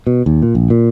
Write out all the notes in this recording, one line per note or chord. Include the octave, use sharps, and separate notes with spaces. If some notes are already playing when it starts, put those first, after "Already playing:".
B2
D#2
A#2
A#1
A#2